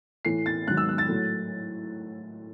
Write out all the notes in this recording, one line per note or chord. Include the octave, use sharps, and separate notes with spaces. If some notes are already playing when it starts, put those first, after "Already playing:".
A2 E3 A3 C7
A6
G#2 D#3 F#3 F#6
E6
F#6
A6
A2 F#3 A3